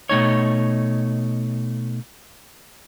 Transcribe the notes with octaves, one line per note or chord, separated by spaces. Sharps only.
B2 A3 D#4 C#5